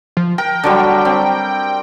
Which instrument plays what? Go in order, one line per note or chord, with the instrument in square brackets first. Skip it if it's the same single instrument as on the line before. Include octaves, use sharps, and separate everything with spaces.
[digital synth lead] F3
[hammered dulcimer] A#4 [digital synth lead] G5
[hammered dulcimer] D3 F#3 G3
C4